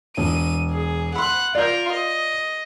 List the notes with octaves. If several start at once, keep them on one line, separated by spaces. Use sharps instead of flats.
E1 D#7
G#4
F#5 B5 C6 F#6
F4 A#4 D5 G6
D#5